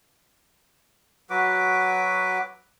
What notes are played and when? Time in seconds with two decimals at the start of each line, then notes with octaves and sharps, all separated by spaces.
1.30 F#3 F#4 B4 D6